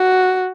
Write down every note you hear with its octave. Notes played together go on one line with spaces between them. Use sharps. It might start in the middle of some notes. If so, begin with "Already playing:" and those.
Already playing: F#4